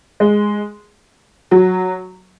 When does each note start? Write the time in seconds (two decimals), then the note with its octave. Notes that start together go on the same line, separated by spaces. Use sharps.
0.20 G#3
1.51 F#3